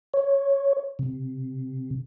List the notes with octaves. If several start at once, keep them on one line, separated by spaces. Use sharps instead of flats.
C#5
C3